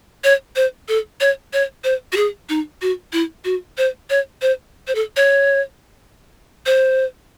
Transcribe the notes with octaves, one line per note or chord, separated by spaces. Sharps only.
C#5
C5
A4
C#5
C#5
C5
F#4
G#4
D#4
F#4
E4
F#4
C5
C#5
C5
C5
A4
C#5
C5